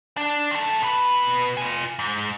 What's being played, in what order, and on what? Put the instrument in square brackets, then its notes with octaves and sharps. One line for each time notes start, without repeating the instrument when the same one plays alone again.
[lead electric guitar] D4
D#3 A4
B2 B4
F4 G#5
G#2